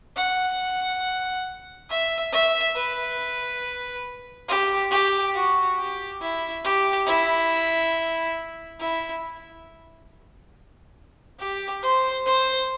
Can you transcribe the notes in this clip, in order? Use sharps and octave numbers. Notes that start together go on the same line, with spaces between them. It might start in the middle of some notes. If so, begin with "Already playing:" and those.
F#5
E5
E5
B4
G4
G4
F#4
G4
E4
G4
E4
E4
G4
C5
C5